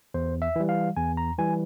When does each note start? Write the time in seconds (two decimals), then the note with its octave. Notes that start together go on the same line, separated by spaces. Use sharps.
0.14 E2 C5
0.42 E5
0.56 E3 G3
0.69 F5
0.97 E2 G#5
1.17 A#5
1.38 E3 G3 G#5